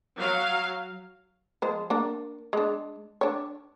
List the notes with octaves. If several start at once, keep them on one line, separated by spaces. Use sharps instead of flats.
F#3 F5
F3 G#3 C5
A#3 D4
G#3 D4
D4 C#5